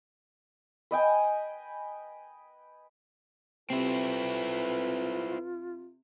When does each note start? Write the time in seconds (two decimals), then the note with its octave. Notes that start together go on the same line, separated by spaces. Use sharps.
0.91 B4 D#5 G5 G#5
3.70 C3 C4 E4 F4 A4 B4